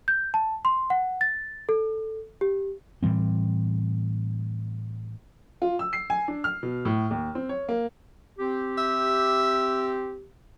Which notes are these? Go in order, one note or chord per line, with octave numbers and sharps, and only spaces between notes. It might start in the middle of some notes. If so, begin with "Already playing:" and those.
G6
A5
C6
F#5
A6
A4
G4
A2 E3 G3 C4
F4
E6
C7
G#5
D4
F6
B2
A2
D#2
C4
C#5
A#3
C4 G4
E5